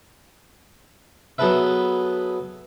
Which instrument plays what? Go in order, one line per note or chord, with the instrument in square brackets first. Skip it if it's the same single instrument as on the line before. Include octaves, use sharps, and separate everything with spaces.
[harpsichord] F#3 B3 G#4 A4 B4 E5